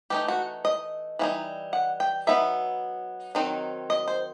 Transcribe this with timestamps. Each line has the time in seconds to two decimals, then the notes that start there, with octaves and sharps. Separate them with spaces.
0.10 E3 A3 D#4 G4
0.28 F#4
0.65 D#5
1.19 E3 G3 C4 D#4
1.73 F#5
2.00 G5
2.27 F#3 B3 D#4 E5
3.35 D#3 F#3 C4 D#4
3.90 D#5
4.08 C5